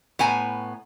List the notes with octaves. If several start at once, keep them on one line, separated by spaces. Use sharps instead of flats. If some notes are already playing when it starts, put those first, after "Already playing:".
A2 B3 G#5 A#5